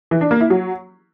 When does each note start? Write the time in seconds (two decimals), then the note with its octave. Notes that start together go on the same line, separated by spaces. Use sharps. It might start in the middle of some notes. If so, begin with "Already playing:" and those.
0.11 E3
0.21 D4
0.31 A#3
0.41 E4
0.50 F#3